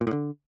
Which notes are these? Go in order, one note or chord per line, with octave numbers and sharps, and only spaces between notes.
A#2
A2
D3